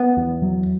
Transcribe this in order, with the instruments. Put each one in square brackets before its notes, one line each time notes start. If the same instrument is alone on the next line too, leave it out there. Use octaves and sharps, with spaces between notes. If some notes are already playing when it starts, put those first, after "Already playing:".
Already playing: [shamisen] B3
[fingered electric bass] E2
F#3